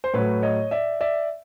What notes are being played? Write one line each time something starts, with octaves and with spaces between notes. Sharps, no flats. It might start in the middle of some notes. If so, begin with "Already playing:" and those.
C5
A2 F#3 B4 C#5
C#5 D#5
D5 E5
D5 E5